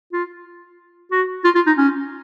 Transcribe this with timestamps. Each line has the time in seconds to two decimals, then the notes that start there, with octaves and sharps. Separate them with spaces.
0.13 F4
1.12 F#4
1.44 F4
1.55 F4
1.66 D#4
1.78 C#4